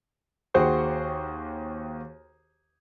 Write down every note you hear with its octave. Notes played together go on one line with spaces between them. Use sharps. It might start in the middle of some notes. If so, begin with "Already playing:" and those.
D#2 F#4 G#4 C5 G5 C#6